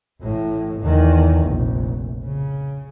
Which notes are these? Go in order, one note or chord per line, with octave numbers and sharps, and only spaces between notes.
A1 A2
E2 D#3
F1 A#1
C#3